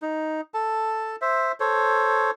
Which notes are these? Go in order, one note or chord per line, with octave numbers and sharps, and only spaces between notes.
D#4
A4 A5
C5 E5
A4 C5 C#5